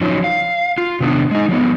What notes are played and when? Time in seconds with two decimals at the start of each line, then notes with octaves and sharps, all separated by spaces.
0.01 F3 F#3 C#4 D#4 F4
0.24 F5
0.78 F4
1.00 C3 D#3 B3 D4
1.31 G#3 D#4
1.49 F3 G3 B3